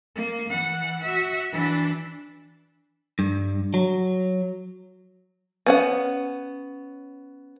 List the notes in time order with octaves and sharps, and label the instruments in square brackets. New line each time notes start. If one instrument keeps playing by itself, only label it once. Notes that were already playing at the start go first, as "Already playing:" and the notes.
[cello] A#3
E3 F#5
F#4 E5
E3 D4
[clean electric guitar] G2
F#3
[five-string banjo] B3 C#4 F#5